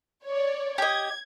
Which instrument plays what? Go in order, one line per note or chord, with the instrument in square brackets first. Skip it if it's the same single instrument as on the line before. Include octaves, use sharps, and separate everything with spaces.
[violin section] C#5 D5
[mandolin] G4 D#5 [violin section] G#6